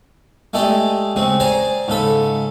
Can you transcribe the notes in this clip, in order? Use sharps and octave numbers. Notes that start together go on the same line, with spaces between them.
G#3 A3 E4 G4 D5 D#5
C#3 G#3 C4
G#4 C5 D5 G#5 A#5
G#2 C#3 A4 B5